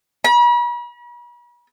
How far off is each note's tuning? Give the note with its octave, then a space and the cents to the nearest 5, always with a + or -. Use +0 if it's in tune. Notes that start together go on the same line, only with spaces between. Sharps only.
B5 -45